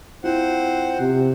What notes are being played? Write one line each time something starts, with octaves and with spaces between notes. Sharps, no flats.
C4 E4 F4 C5 F#5
C3